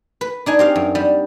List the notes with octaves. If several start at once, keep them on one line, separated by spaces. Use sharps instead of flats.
B4
D4 D#4 G#5
C4 G4 F5
F#2
G3